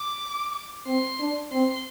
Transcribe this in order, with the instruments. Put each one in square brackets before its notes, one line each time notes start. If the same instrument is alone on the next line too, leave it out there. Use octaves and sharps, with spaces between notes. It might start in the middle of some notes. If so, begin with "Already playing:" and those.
Already playing: [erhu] D6
[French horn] C4 [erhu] C6
[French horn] D4
[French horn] C4 [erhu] C6